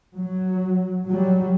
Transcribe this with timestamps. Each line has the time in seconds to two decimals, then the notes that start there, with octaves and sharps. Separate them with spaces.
0.16 F#3
1.09 F#3 G3